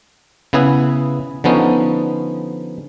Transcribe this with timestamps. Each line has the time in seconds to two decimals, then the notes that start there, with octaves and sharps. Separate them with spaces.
0.53 C#3 B3 E4 G#4 B4
1.44 D3 F3 B3 C#4 D#4